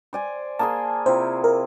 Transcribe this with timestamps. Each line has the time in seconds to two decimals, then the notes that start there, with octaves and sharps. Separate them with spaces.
0.13 C5 D5 G#5
0.59 A#3 G#4 A5 C6
1.06 C3 E4 F4 C5
1.44 A#4